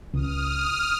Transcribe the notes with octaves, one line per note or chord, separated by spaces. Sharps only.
C#2 D#6 F6